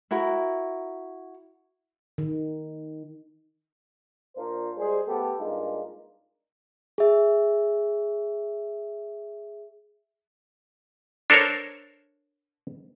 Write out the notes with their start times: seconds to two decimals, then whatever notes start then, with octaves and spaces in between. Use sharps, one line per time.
0.11 E4 F#4 A#4
2.18 D#3
4.36 A#2 D4 F4 A#4 C5
4.77 G3 G#3 G#4 C5
5.06 A3 B3 G4 A4
5.39 G2 G#3 A#3 D4 D#4 F4
6.98 G#4 E5
11.30 D4 A4 A#4 C5 C#5